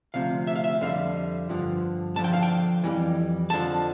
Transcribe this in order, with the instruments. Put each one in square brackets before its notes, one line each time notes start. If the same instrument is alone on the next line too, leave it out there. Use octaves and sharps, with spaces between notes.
[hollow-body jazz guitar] D2 C3 F3 F5
E5
F5
E5
F2 D3 G3 F5
G2 D3 F3
D2 D3 F3 A5
G5
F5
G5
F2 E3 G3
F2 D3 F3 A5